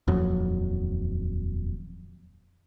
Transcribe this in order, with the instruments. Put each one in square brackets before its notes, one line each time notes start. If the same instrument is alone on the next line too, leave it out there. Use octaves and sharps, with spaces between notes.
[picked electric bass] D#1 F2 F#3